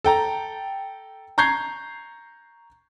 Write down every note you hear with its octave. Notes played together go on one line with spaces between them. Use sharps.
A4 G5 A#5
A#5 C#6 G6 G#6 C7